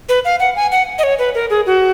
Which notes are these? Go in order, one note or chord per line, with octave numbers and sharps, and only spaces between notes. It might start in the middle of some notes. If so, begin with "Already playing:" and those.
B4
F5
F#5
G#5
F#5
D#5
C#5
B4
A#4
G#4
F#4